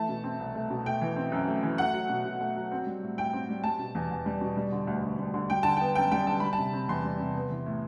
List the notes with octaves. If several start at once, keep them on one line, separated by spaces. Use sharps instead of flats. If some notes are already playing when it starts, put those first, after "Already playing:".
Already playing: E3 A3 A5
B2
C4
C2
A3
B2
A3 G5
E3
C4
F#2
A3
E3
A3 F#5
F#3
B2
B2
A3
F#3
C4
G3
A2
A2 G5
C4
G3
G3 A5
B2
E2
E2
G3
B2
G3
D3
D2
D2
G3
D3
G3 G5
D3 A5
B3 G5
F#2 G5
G3 G5
D3 A5
G3 B5
A5
C3
C4
E2 C6
G3
C3
B3
E3
A2